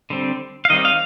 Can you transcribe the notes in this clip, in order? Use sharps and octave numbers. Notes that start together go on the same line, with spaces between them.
D3 G3 C4
F5
D#3 G3 C4 D#5
F5